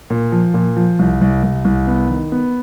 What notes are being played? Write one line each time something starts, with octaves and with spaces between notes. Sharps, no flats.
A#2
F3
A#2
F3
C2
C2
C2
C2
B3
D#3
B3